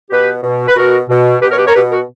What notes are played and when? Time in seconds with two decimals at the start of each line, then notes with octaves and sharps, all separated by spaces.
0.10 B2 G4 B4
0.43 B2
0.67 B4
0.76 B2 F#4 A#4
1.09 B2
1.41 B2 G4 B4
1.50 A#4 C#5
1.58 G4 B4
1.66 A#4 C#5
1.74 B2 G4 B4
1.91 F#4 A#4